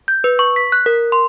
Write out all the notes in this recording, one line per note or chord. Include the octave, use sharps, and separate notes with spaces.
G6
B4
C#6
B6
F#6
A#4
C6